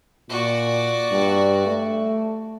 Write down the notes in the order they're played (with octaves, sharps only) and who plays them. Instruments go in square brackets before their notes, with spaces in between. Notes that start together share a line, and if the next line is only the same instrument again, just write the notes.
[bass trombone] A#2 [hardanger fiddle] F#4 D5
[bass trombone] G2
A3